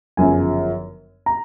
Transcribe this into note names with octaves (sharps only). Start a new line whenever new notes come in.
G1 F#2 C#3 F3 G#5
A#5